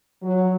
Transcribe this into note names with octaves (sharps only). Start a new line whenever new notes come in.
F#3